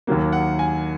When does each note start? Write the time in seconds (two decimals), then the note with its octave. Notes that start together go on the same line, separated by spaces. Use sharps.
0.07 D#2 D#3 F#3 A#3
0.32 F#5
0.59 G#5